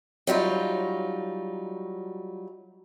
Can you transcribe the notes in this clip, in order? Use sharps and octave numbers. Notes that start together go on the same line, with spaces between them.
F#3 G3 D#4 F4